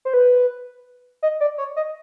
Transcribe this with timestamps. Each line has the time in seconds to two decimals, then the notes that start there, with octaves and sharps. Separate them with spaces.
0.05 C5
0.14 B4
1.23 D#5
1.40 D5
1.58 C#5
1.76 D#5